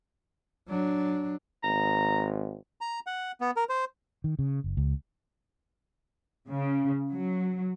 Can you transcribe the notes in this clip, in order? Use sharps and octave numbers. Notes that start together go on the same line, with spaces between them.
F#3 D4
G#1 A#5
A#5
F#5
B3
A#4
C5
D#3
C#3
F#1
C#2
C#3
F#3